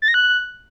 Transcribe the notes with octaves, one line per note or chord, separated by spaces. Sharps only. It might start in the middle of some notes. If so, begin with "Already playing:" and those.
A6
A#6
F#6